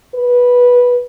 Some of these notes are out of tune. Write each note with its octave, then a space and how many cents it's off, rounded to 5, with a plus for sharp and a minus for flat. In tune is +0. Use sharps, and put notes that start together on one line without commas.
B4 -10